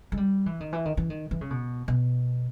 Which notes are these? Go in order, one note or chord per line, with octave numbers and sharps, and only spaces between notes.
G#3
G3
E3
D#3
E3
D#3
E3
D#3
E3
C#3
B2
B2